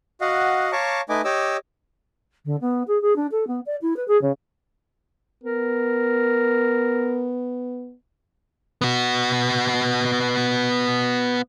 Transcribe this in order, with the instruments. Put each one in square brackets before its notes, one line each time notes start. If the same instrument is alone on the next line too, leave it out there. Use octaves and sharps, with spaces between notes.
[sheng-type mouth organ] F#4 D#5 F5 F#5
C#5 F5 A5 A#5 C#6 D6
A3 D#4 B4 D#5 G#5 D6
G4 C#5 D#5 D6 E6
[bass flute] D3
B3
G#4
G#4
D4
A4
B3
D5
E4
B4
G#4
C#3
[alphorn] B3 [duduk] A#4
[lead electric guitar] B3 F#4